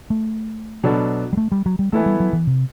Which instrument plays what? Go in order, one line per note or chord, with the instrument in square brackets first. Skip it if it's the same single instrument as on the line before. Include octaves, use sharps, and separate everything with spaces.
[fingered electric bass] A3
[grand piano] B2 F#3 B3 D4 A4
[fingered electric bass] G3
A3
G3
F#3
G3
[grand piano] E3 B3 E4 A4 [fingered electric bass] A3
[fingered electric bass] G3
F#3
E3
C3